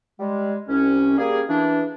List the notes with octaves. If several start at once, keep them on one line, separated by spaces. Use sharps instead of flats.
G3 G#3
C2 C#4
G3 A#3 G#4
E3 D4